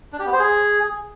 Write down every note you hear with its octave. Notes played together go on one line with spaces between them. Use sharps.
D4
G4
B3
C5
G#4